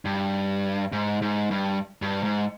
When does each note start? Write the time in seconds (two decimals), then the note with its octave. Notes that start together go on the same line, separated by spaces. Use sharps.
0.05 G2
0.92 G#2
1.22 G#2
1.51 G2
2.02 G2
2.24 G#2